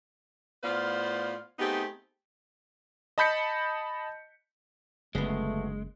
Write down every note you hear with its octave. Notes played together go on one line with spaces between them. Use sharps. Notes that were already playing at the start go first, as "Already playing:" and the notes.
A2 B3 F4 C5 D5 F5
A3 B3 C4 D#4 G4 G#4
D#5 A5 B5 G6 B6 C#7
F#1 D2 C#3 G#3 A3 B3